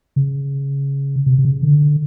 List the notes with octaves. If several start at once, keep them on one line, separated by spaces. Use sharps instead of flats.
C#3
C3
C3
C#3
D3